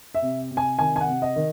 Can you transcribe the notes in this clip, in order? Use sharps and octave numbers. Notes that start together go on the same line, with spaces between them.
E5
C3
C3
G#5
D#3 G#5
G#5
F#5
C3
D#5
D#3